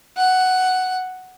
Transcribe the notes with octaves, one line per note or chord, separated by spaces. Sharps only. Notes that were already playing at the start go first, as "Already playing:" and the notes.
F#5